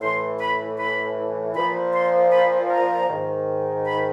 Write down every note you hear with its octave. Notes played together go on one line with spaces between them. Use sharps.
A2 E3 C6
B5
B5
A#2 F3 B5
C6
B5
A#5
G#2 D#3
B5